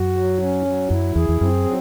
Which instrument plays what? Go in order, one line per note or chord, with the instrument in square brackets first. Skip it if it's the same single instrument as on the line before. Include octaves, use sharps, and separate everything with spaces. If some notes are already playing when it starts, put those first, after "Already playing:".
Already playing: [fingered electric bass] F#2 [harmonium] F#4
[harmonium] F#3
C#4
F#3
[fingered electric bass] F#2 [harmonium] E4
[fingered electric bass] E2 [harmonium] G#4
[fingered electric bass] E2
[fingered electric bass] F#2 [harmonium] C4
[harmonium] F#3